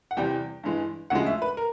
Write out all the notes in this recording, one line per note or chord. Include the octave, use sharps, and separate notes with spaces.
F#5
E2 C3 E3 G3 G5
G2 E3 G#3
D2 C#3 F3 G#3 F#5
E5
B4
A#4